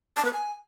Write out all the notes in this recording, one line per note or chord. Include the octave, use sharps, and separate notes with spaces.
A5
B4
G#5